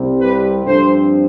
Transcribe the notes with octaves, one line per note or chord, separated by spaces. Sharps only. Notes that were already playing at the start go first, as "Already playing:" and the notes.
Already playing: C2 C3 G3 C4
G4 B4
G2 F3 C4 A4 C5